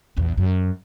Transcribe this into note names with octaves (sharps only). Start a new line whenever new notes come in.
A#1 E2
F#2